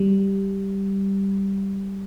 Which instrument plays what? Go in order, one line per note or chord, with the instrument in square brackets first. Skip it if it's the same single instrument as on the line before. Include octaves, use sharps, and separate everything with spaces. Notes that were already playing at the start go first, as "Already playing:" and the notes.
Already playing: [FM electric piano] G3